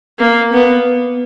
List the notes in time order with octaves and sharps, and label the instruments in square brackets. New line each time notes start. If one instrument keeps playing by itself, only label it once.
[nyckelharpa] A#3
B3